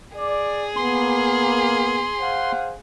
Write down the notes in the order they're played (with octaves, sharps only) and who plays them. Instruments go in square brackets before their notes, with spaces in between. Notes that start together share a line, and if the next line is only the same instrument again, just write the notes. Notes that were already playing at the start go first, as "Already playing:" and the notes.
[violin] G#4 [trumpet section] D5
[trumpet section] A#3 [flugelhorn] B3 [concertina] C6
[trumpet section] C5 F5 F#5